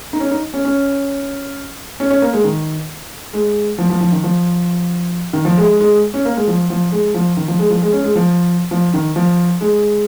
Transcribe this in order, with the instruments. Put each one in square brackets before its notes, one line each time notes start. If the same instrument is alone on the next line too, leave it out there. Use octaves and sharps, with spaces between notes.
[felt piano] D#4
C#4
D#4
C#4
C#4
C#4
C#4
A#3
G#3
D#3
G#3
F3
F3
F3
D#3
F3
D#3
F3
G#3
G#3
C#4
A#3
G#3
F3
F3
G#3
F3
D#3
F3
G#3
F3
G#3
C#4
G#3
F3
F3
D#3
F3
G#3